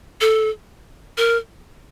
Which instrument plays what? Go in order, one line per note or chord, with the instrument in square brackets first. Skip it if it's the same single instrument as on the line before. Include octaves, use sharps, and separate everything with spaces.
[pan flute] A4
A#4